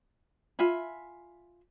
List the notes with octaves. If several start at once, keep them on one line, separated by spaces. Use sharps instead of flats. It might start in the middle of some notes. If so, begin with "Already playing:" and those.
F4 E5 G#5 B5